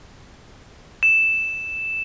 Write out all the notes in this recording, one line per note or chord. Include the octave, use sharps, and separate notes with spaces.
E7